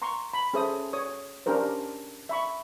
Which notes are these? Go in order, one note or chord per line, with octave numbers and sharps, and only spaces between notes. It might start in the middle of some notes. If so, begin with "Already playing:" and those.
A#5 C6 C#6
B5
C#4 G#4 A4 C5 E5 D#6
C#5 D#6
C#4 D4 G4 A#4 C5
E5 B5 C#6